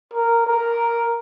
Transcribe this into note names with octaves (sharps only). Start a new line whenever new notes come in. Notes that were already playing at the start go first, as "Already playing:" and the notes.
A#4
A#4